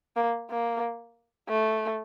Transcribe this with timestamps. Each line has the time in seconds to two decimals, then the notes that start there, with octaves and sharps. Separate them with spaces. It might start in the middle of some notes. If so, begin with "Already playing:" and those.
0.16 A#3
0.50 A#3
1.49 A3